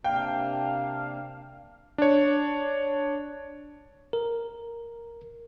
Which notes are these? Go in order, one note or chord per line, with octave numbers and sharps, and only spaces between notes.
C3 A#3 D4 F5 G5
D4 C#5
A#4